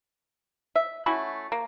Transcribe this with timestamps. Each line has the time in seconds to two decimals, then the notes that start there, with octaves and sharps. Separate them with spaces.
0.76 E5
1.06 A3 C#4 E4 F#4
1.52 A#3